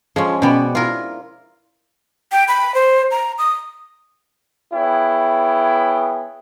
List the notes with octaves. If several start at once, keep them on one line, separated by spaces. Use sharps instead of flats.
F3 G#3 C#4 F4 G#4 A4
B2 B3 C#4 D5 G5 B5
E4 F4 A#4 C#5
G5
B5
C5
A#5
D#6
B3 E4 G#4 C#5 G5